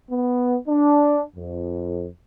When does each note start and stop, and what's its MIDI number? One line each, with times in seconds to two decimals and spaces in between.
0.11 0.56 59
0.68 1.22 62
1.36 2.08 41